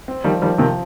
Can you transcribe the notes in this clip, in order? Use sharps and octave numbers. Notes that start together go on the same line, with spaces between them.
C4
D#3 F3 G3
D#3 F3 G3
C3 D#3 F3